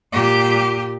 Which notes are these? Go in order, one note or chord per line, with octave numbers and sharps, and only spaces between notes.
A#2 G4